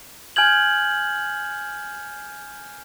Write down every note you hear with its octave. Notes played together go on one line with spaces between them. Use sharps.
G#5 F6 G6 G#6 F#7